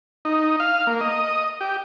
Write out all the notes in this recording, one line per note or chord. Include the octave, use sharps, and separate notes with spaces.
D#4
F5
A#3
D#5
G4